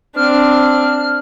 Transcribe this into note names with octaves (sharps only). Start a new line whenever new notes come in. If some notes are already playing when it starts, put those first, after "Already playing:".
C4 D4 F6